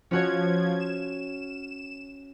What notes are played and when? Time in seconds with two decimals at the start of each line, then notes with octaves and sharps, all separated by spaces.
0.11 F3 C#4 F#4 C#5 G#6
0.80 E7